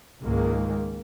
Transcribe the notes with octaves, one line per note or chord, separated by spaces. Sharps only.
C#2 G#2 D#3 G#3 A#3